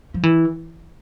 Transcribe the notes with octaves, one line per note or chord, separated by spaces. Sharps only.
F3
E3